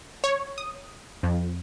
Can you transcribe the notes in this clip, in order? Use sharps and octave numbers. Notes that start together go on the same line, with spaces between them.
C#5
D#6
F2